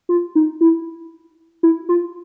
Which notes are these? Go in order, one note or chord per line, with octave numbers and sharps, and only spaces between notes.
F4
D#4
E4
E4
F4